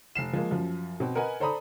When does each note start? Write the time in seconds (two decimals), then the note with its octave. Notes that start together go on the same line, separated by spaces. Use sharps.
0.15 F1 C7 E7
0.33 F3 G#3 A#3
0.51 F#2 F3
1.00 B2 C4
1.15 A#4 B4 D#5 F#5 G#5 B5
1.40 A4 C5 D5 A#5 B5 D#6